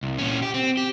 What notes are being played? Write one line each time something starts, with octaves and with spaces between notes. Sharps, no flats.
C2
A#2 C#4
G4
C4
G4